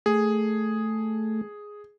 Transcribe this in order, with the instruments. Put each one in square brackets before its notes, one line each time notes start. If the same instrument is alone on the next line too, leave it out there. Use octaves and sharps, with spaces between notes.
[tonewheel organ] A3 [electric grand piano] G#4